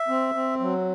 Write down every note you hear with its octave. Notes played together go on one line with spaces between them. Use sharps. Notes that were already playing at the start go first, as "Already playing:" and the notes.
Already playing: E5
C4
C4
F#3